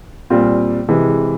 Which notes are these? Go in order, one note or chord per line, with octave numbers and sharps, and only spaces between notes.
A#2 G3 C4 F4
C3 E3 G#3